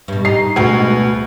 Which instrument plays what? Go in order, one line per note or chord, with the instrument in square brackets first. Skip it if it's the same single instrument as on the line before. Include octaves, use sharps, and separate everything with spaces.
[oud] G2 B2
[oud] D#4 [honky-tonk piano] C7
[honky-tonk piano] D2 [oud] B2 G#3